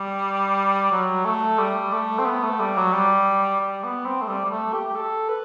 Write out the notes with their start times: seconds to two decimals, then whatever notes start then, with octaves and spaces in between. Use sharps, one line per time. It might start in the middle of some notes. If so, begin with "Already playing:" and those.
Already playing: G3
0.92 F#3
1.25 A3
1.58 G3
1.93 A3
2.19 C4
2.26 B3
2.44 A3
2.60 G3
2.77 F#3
2.93 G3
3.61 G3
3.84 B3
4.06 C4
4.22 A3
4.28 G3
4.45 G3
4.50 A3
4.74 G4
4.88 G4
4.96 A4
5.29 B4